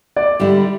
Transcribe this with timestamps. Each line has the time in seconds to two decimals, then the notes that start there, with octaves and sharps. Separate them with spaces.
0.16 D5
0.40 D3 G3 E4